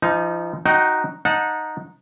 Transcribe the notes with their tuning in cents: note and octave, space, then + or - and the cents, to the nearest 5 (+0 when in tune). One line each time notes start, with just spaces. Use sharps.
F3 -30 D#4 +5
D#4 +0 F#4 +0 G5 -30
D#4 +0 F#5 -20 A5 +0